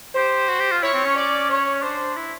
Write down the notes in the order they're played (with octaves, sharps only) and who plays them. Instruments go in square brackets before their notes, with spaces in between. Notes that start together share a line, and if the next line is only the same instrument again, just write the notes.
[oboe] G4 [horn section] C5
[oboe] F#4
G4
F4
[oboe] E4 [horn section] C#5
[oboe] C4
C#4
[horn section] D5
C#5
[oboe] D4 [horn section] C5
[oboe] E4